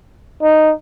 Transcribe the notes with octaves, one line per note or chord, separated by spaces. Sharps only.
D#4